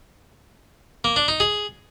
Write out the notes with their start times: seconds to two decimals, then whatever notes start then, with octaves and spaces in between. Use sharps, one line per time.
1.04 A#3
1.16 D4
1.28 D#4
1.40 G#4